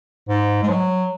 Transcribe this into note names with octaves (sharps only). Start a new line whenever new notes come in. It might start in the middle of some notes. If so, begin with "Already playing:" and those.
G#2
G#3
F#3